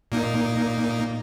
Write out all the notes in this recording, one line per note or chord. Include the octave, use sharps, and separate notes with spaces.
A#2 A#3 D#4